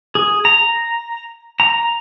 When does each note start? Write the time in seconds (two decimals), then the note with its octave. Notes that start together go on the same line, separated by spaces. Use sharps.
0.15 G#4
0.45 A#5
1.60 A#5